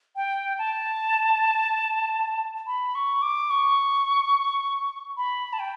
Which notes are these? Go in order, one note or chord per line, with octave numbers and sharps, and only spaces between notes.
G5
A5
B5
C#6
D6
C#6
B5
A5
G5